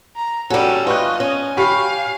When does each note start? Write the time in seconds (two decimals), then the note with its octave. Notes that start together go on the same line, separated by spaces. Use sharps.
0.16 A#5
0.50 G3 C#4 F#4 A4
0.87 F4 B4 D#5 C#6 F#6
1.20 C#4
1.57 G4 F5 B5 C#6